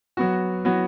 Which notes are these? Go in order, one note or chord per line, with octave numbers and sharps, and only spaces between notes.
F#3 B3 F#4
F#3 B3 F#4